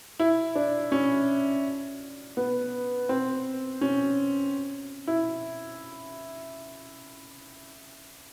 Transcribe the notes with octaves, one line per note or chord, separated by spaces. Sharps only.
E4
D4
C#4
B3
C4
C#4
E4